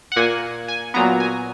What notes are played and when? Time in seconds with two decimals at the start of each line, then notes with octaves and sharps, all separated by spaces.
0.12 F#5
0.16 A#2 A#3 G#5
0.68 G#5
0.94 A#2 F#3 B3 A#5
1.20 G#5